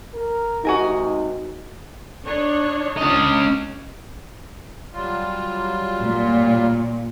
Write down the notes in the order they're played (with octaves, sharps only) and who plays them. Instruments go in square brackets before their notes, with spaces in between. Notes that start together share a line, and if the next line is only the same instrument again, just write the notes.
[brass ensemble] A#4
[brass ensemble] G#2 C3 [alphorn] D#4 [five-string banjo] F#4 G#4 A#4
[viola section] D4 D#4 C#5
[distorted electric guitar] C#4 D#5
[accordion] F#3 G3 F4
[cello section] A#2